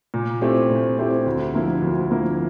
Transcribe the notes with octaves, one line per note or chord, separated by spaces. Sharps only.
A#2
A3 C4 E4 G4
A#2
A3 C4 E4 G4
D2
D3 F3 A#3 E4
D2
D3 F3 A#3 E4